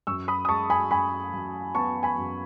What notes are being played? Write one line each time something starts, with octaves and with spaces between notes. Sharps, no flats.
F#2 C#6 E6
B5 D#6
D#6
G#3 A5 C#6
G#5 B5
F#2 G#5 B5
F#2
B3 A5 C#6
G#5 B5
F#2